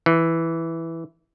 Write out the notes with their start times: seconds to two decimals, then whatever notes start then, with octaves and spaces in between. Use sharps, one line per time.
0.06 E3